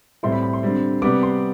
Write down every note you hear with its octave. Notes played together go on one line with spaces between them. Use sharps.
A2 G3 C4 E4 C6
B5
B5
C6
D3 G3 C4
C3 G3 B3 D6
C6